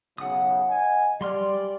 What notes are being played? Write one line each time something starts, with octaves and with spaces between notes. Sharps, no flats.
B1 C#3 F#5 D#6
D#5 G#5
G3 G4 D5 C6 F6